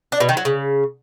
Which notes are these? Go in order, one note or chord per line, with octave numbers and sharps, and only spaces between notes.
D4
B2
D#3
F#3
C#3